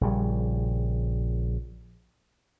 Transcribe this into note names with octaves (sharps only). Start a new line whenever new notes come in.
A#1 C#3 G3